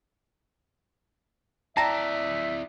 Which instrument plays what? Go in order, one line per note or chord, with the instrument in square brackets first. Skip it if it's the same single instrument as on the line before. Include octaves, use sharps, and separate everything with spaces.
[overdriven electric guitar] E4 D5 [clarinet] E5 [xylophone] G5 A#5 A#6 [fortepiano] A5